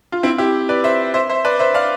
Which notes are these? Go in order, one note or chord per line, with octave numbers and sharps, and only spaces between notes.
F4
C4 E4
E4 G4
B4 D5
C5 E5
C5 E5
C5 E5
B4 D5
C5 E5
D5 F5